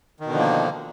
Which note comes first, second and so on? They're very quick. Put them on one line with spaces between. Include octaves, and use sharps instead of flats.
D#3 B2 D3 F3 A#3